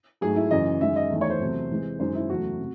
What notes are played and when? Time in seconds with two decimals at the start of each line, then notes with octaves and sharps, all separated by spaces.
0.21 G#2 F#3 A3 G#4
0.36 E4
0.51 F#2 C#3 E3 D#5
0.81 F#2 D#3 G#3 E5
0.96 D#5
1.11 E2 D#3 A3
1.21 C#5
1.30 C5
1.40 E2 C3 F#3 A3
1.71 C3 E3 G#3
2.00 F#2 D#3 G#3 C5
2.15 E4
2.30 E2 C#3 F#3 A3 F#4
2.59 C3